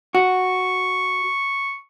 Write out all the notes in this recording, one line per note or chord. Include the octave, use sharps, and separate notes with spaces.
F#4 C#6